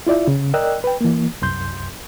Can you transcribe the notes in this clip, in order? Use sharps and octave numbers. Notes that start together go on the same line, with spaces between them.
E4 F4 D5 E5
C#3
A#4 D5 D#5 G5 E6 F#6
B4 G5
E3 A#3
C2 F#2 C6 G6